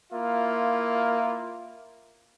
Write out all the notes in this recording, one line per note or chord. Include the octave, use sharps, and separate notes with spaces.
A#3 E4 F4 E5